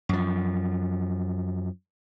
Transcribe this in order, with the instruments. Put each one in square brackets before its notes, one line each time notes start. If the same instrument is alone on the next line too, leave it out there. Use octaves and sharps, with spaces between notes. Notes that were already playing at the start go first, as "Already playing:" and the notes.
[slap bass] F#2 F3